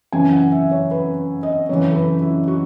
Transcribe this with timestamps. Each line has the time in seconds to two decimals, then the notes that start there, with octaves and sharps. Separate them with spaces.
0.12 F#2 C#3 E3 G#5
0.32 F#5
0.52 E5
0.71 C#5
0.91 B4
1.43 D#5
1.69 F#2 C#3 E3 C#5
1.91 A4
1.96 B4
2.22 E4
2.48 F#4